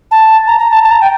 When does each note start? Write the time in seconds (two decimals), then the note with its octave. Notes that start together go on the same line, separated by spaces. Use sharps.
0.11 A5
0.47 A#5
0.59 A#5
0.71 A5
0.83 A5
0.91 A#5
1.01 G5